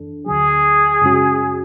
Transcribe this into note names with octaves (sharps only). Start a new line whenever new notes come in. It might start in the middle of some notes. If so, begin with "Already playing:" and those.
Already playing: F#2 E3 D4 A4
D2 D3 F#3 G#4
F#2 C#3 G#3 C#4 F#4